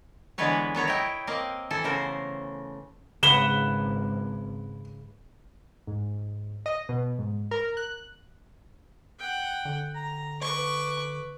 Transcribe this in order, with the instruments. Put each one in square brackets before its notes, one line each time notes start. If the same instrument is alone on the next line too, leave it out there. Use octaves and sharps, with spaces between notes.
[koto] D3 E3 G#3 B3 B4 C#5
F#3 B3 C#5 A#5
E4 D#5 G5
A#3 C4 D#5 F5
E3 A4 G#5
C#3 A3 B3 A#4 C5
[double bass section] G#1 [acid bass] C#3 [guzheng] B4 F#5 [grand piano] E7 G7
[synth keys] G#2
D#5
B2
G#2
A#4
F#6
[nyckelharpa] F#5 G5
[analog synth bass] D3
[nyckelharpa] A#5
[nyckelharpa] B4 D6 [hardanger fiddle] C#6